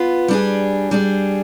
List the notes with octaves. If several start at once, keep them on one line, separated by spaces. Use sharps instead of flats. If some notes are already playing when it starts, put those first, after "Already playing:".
Already playing: B3 F4
G3 D4 G#4
G3 D4 G#4